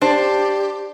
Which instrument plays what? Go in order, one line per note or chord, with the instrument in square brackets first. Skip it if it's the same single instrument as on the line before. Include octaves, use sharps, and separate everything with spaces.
[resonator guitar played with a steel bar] D4 [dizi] G4 [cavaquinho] C5 A5